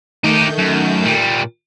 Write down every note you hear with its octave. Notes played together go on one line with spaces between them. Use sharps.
D#3 A3 D#4 G4 G6
F#2
A#2 G3